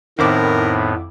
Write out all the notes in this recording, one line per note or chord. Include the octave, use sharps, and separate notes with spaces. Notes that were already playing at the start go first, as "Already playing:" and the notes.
F2 A2 D#3 B3 C4 E4 A#4 D6